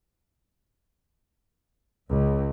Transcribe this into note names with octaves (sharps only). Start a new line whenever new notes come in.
C#2